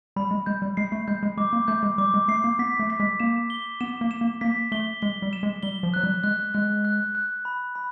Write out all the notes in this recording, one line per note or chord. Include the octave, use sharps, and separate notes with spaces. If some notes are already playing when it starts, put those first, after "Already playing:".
G3 B5
G#3
G#3 G6
G3
G#3 C7
A3
G#3 G6
G#3
G#3 D6
A#3
A3 G6
G#3
G3 D6
G#3
A3 C7
A#3
B3 B6
A3
B6
G#3
A#3 E7
G7
B3 E7
A#3
E7
A#3
A#3 B6
A3 G7
G#3 G7
G3
E7
G#3
G3 G7
F3
F#3 F#6
G3
G#3 F#6
G#3 F#6
F#6
F#6
B5
B5